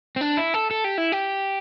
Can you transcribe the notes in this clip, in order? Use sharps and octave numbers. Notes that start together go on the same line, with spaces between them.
C4
D4
E4
A4
A4
G4
E4
G4